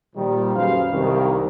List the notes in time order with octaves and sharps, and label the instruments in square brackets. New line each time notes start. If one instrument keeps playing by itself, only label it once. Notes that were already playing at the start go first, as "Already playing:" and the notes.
[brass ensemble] A#2 D#3 F3 G3
F#2 G#4 B4 C5 F5
C2 D#3